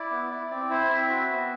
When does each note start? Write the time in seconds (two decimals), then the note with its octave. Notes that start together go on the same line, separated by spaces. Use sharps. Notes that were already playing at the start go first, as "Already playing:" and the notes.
Already playing: E4 D5
0.11 B3
0.31 E4
0.51 C4 D5
0.70 E4 C5
0.90 C4 E5
1.09 F#4
1.30 B3